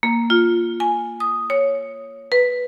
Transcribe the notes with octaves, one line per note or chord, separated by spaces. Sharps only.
A#3
F4
G#5
D#6
C#5
B4